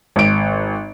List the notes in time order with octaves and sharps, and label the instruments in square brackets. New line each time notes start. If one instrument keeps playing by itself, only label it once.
[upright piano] G#1 D7